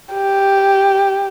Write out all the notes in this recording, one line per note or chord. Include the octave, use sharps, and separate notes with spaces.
G4